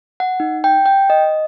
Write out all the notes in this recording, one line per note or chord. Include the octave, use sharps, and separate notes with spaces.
F#5
D#4
G5
G5
D#5